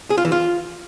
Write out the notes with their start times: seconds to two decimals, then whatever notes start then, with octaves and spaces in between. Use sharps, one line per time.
0.10 G#4
0.18 F4
0.25 E3
0.32 F4